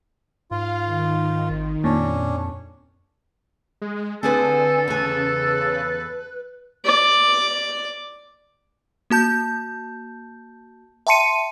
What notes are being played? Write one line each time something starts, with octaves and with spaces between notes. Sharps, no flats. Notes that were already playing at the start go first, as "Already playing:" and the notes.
G#2 F4 F5
D#3
G#1
F2 A#2 C#4 D4
G#3
D3 C4 G#4 A4 B4 G#5
E2 C#3 B4 G#5
D5
A#3 F#4 A5 G6
E5 G5 A5 C6 C#7 D#7